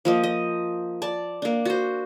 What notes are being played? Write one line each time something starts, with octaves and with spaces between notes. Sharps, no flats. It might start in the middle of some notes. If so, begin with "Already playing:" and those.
F3 A#3 D#5
D#5
D5 A5
A#3 D4
F#4 C5